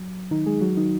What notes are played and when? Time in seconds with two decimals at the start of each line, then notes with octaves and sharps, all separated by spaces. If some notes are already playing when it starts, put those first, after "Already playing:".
Already playing: F#3
0.31 D#3 D#4
0.46 G#3 G#4
0.61 F#3 F#4
0.77 D#3 D#4